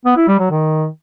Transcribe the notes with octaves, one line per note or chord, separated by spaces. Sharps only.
B3
E4
G3
F#3
D#3